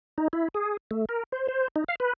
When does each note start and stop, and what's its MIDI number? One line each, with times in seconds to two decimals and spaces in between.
0.18 0.28 63
0.33 0.48 64
0.54 0.77 68
0.91 1.05 57
1.09 1.23 70
1.32 1.48 72
1.48 1.68 72
1.76 1.84 63
1.88 1.95 77
2.00 2.13 71